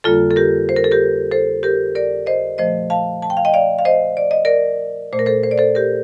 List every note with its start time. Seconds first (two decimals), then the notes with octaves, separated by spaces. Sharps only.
0.04 F2 D3 G3 A#3 F4 A4
0.31 A4
0.36 G4 A#4
0.69 C5
0.76 A#4
0.84 A4
0.91 G4 A#4
1.31 A4 C5
1.63 G4 A#4
1.95 A#4 D5
2.26 C5 D#5
2.58 A#2 F3 A3 C5 D#5
2.90 F5 A5
3.22 A5
3.30 G5
3.37 F5
3.45 D#5 G5
3.54 D5 F5
3.79 F5
3.85 C5 D#5
4.17 D5
4.31 D#5
4.45 A#4 D5
5.13 A#2 A3 C5
5.19 A#4
5.26 A4 C5
5.44 C5
5.51 D5
5.58 A4 C5
5.75 G4 A#4